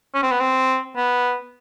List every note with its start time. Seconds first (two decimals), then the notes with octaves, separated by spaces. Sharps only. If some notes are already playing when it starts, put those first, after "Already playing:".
0.14 C#4
0.23 C4
0.31 B3
0.40 C4
0.97 B3